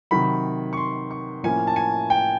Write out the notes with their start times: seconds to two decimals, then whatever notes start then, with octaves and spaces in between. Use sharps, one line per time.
0.11 C3 D#3 F#3 B5
0.73 C#6
0.77 C6
1.11 C#6
1.43 A2 F3 A#3 C#4 E4 G#5
1.67 A5
1.76 G#5
2.10 G5